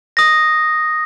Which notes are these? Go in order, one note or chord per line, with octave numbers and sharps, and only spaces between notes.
D#6 A#6